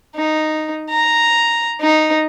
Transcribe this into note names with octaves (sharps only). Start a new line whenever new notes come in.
D#4
A#5
D#4